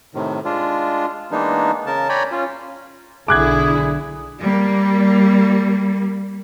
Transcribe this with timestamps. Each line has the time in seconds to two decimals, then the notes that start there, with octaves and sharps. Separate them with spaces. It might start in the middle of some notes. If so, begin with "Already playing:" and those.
0.15 A2 C3 D#3
0.45 G#3 D4 F4
1.31 E3 G#3 A#3 B3 D4 D#4
1.86 C#3 A#4 A5
2.09 C#5 D5 G5 G#5 A#5 B5
2.32 C#4 F4
3.28 B1 D3 E4 G#4 D6 F#6 G#6
4.39 G3 A#3